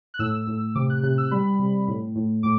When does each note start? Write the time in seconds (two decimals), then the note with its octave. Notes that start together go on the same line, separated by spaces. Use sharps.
0.14 F#6
0.19 A2 E6
0.47 A2
0.75 C3 D6
0.90 F#6
1.03 C3 F#6
1.18 E6
1.31 G3 B5
1.59 C3
1.88 A2
2.15 A2
2.43 A2 D6